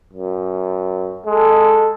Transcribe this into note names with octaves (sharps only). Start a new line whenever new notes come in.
F#2
G#3 A4